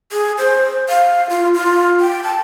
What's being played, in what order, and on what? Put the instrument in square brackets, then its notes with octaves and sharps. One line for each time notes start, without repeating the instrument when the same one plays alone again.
[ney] G#4
C5
F5
F4
F4
G5
A5